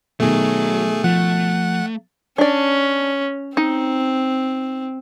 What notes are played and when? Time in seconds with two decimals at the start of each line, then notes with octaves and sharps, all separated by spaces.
0.20 B2 D#3 F#3 A3 G#4
1.04 F3 A3 F#5
2.38 C#4 D4 D5
3.57 C4 D#4